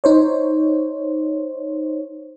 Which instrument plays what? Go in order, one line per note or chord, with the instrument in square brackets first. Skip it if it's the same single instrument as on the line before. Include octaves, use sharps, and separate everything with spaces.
[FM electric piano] D#4 C5 C#5